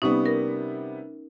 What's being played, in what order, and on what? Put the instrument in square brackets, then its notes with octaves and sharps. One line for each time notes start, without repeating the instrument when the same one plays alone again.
[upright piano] C3 G3 B3 [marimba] C#4 D#4
[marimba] A#4